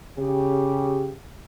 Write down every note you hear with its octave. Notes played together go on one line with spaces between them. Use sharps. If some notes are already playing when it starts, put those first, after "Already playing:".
C#3 G4